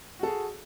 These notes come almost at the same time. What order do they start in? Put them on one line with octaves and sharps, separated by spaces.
F#4 A4 G#4